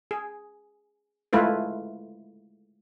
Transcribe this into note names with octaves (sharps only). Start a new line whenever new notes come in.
G#4
G#3 A3 E4 F4 B4